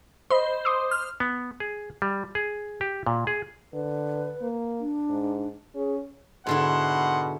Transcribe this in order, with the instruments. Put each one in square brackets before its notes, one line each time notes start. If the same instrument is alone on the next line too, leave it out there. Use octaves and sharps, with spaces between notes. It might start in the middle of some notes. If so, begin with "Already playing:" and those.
[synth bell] C5 [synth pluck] D#5 B5
[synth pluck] C6 D6 D#6
[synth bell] F6
[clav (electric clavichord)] B3
G#4
G3
G#4
G4
A#2
G#4
[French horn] D3 [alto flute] B4
[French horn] A#3
[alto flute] D4
[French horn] G#2
[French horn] C#4 [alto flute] G#4
[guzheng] G#2 D3 E4 [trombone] B2 [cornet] F#5 [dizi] C6